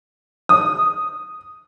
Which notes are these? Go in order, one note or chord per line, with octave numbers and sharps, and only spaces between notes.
D#6